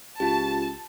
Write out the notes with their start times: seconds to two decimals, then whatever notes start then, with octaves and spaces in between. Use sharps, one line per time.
0.20 C#2 F4 G4 A5